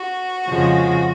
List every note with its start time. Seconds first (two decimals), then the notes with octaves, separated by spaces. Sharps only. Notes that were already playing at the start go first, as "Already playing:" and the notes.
Already playing: F#4
0.47 F2 C#3 F3 G#3